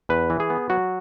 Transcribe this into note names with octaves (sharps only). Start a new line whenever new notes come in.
E2 B4
E3
G#4
B3
F#3 F#4